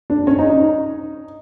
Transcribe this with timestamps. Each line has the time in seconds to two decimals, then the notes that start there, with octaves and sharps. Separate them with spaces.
0.10 D4
0.27 C#4
0.39 D#4
0.49 D#4